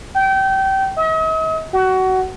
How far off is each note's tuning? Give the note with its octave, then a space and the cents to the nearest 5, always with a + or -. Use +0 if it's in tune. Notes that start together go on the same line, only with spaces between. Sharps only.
G5 -25
D#5 +45
F#4 +20